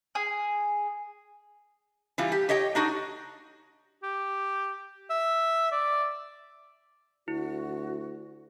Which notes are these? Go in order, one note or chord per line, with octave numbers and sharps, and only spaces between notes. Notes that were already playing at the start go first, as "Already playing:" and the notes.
G#4
E3 G3 F4
G4
G4 C#5 D#5 G5
D4 D#4 F#4
G4
E5
D5
D2 E4 F#4